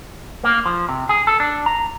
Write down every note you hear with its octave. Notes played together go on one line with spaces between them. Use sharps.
A#3
F3
C3
G#4
A4
D4
A#5